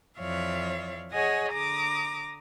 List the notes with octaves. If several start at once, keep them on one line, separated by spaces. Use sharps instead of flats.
F2 E3 C#5 D5 E5 F5
G#4 C#5 D#5 F#5 G#5
D3 A#5 D6 D#6 A#6